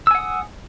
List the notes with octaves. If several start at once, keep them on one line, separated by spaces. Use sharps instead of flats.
F#5 G#5 D#6 E6